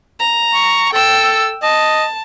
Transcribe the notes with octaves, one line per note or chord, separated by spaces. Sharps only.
A#5
C#6
A4 G5 E6
D#5 A5